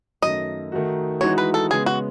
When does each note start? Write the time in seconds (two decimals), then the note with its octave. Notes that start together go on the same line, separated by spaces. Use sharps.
0.22 F#2 D#3 A3 D#5
0.72 D#3 A3 D#4 F#4
1.21 E3 G#3 D#4 F#4 C#5
1.38 B4
1.54 A4
1.71 C#3 G#3 B3 G#4
1.86 F#4